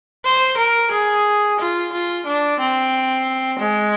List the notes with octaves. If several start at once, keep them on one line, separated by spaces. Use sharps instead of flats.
C5
A#4
G#4
F4
F4
D4
C4
G#3